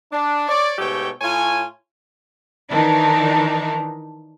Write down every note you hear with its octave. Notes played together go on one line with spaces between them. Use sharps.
D4
C#5 D5
G#2 B2 A3 G4 C#5 G5
A2 F4 C#5 G#5
D#3 E3 D4 D#4